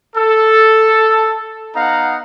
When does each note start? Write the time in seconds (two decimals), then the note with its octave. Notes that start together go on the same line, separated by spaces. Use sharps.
0.16 A4
1.76 B3 D#4 F5 F#5 A#5